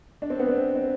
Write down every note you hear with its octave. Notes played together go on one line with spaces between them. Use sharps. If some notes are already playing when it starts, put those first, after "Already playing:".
D4
C4
B3
C4
C4